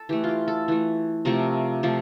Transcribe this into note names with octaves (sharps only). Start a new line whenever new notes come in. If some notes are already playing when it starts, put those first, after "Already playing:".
Already playing: A4
E3 A3 G4
F4
G4
A4
E3 A3
C3 F3 A3 A#4
C3 F3 A3